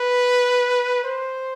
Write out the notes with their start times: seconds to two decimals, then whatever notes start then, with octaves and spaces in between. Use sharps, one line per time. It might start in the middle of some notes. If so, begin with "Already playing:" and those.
Already playing: B4
1.04 C5